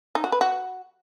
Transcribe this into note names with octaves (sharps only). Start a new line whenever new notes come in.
D#4
F#4
B4
F#4